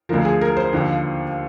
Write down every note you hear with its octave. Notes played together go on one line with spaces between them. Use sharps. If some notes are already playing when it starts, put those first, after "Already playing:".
D2 D3 F3 A#4
G#4
A#4
C5
D#2 D3 F3